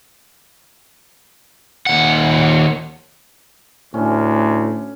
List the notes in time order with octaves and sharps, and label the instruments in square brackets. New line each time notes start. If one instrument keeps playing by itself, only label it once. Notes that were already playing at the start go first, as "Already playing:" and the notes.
[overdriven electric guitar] D#2 F#5
[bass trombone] D2 [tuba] A2 [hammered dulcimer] C#4